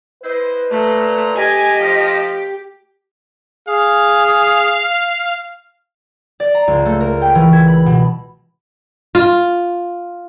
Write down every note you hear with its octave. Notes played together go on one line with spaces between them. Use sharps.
E4 B4 C5 D#5
A#2 A3 A#5
G4 D#5 G#5
F3
G#4 F5
D5
A#5
C#2
A3
A#4
G5
E3
G#6
B5
B2
F4